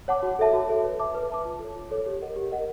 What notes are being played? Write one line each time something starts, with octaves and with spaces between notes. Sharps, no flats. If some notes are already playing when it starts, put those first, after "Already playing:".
C#5 F#5 A5 D6
F#4
A4 C#5 E5 A5
F#4
A4 C#5 E5 A5
B4
E5 A5 D6
B4
E5 A5 D6
F4
A4 C#5
F4
A4 C#5
G4
A#4 D#5 F#5
G4
A#4 D#5 F#5